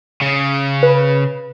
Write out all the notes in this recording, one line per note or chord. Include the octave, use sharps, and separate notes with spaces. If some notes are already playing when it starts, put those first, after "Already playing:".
C#3
B4